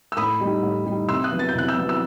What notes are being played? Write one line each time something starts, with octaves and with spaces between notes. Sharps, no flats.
E6
A2 B5 D#6
G3 D#4
A2
G3 D#4
C3 C6 E6
D#6 F#6
F#3 B3
A6
G6
C3 F#6
E6 G6
F#3 B3
E6